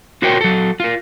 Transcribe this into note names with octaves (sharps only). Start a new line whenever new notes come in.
F4 F#4 A#4 C5 C#5 G5
F#3 A4
F4 A#4